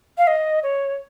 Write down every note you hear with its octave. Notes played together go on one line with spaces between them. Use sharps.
F5
D#5
C#5